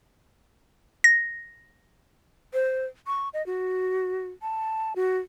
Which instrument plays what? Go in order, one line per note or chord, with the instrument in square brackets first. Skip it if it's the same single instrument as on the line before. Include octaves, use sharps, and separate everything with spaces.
[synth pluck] A#6
[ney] C5
C#6
D#5
F#4
A5
F#4